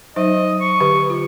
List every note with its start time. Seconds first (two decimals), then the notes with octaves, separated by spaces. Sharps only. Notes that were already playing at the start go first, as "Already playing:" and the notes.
0.16 F#3 D#4 C5 D#5
0.61 C#6
0.80 D3 G4 B4
1.10 F4